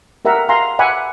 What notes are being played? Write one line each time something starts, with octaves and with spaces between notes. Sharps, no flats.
G4 A#4 E5 F#5 A#5
F5 G#5 A#5 C6
E5 F#5 G#5 B5 D6